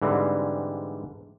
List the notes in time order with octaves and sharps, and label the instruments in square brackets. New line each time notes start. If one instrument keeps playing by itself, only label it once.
[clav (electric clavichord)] G#2 D3 E3 G3 C4